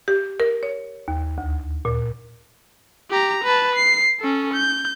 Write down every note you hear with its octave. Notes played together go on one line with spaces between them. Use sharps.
G4
A#4
C#5
D#2
D2
A#2
G4 A#5
B4 A5
C7
C#4 A4
G6